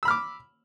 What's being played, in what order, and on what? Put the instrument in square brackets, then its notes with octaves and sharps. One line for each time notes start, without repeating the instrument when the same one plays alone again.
[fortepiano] E6
B5
F6
D6